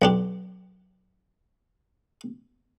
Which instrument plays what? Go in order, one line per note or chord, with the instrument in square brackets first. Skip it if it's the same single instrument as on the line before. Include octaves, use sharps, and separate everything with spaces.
[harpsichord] B1 D4 G4